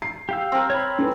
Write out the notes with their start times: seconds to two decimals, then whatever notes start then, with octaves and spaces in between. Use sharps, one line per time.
0.02 C7
0.29 G4 F5 E6
0.52 C4 A#4
0.70 C#5 B5
0.99 C#4 A4 B4